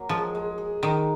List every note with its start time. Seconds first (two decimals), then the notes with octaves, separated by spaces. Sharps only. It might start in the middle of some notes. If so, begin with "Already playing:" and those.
Already playing: F#3 A#3
0.09 F3 G#3
0.35 G#3
0.58 G#4
0.83 D#3 D#4